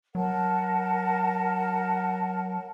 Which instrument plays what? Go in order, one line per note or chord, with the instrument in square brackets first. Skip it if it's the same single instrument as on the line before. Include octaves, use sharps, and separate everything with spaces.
[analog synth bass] F#3 [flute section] A#4 F#5 A5